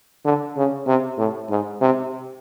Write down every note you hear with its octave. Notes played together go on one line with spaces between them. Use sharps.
D3
C#3
C3
A2
G#2
C3